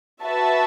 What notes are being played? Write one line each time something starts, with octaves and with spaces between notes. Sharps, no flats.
F#4 B4 E5 A5